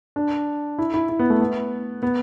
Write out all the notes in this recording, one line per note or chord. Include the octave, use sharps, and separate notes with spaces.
D4
E4
E4
E4
B3
A3
B3
B3